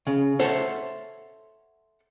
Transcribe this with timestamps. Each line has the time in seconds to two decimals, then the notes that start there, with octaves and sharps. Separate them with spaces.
0.07 C#3
0.40 A4 C5 C#5 E5 F#5